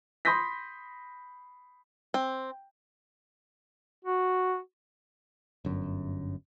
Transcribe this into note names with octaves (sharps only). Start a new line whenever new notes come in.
B5 C6 D#6 G6 A#6 B6
C4
F#4
G1 F#2